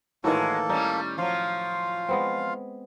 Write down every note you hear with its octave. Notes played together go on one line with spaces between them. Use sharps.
A2 D#3 E3 G#3 A#3 F#4 A4
G3 C#4 D#4
F3 F#3 F4 F5
G#3 B3 C4